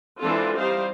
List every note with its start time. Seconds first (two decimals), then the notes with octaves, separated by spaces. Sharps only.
0.20 E3 G#3 C4 D4 F4 A4
0.58 G3 D#4 C5 F5